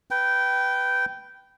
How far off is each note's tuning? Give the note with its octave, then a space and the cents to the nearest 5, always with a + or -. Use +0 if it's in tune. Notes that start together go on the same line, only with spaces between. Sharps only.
B4 +0 G5 -15